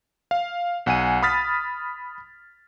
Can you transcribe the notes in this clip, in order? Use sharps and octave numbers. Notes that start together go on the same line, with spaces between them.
F5
B1 F#5 G#5 D#7
B5 D#6 F6 A6 B6